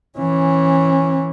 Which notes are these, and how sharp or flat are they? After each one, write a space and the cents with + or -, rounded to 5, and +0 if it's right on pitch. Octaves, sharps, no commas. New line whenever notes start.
E3 +0 C#4 -25